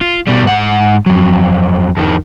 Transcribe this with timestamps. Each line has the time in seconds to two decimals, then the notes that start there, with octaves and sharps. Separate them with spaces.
0.01 F4
0.27 B2 G3
0.43 G#2 F#5
1.06 F2 F#3
1.97 F2 D#3